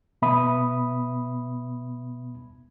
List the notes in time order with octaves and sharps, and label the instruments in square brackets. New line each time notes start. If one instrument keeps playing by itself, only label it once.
[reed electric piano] B2 B3 E5 B5 D#6